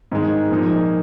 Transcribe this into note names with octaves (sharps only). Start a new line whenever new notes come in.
G#2 D#3 G#3
A#2 F3 A#3 D#4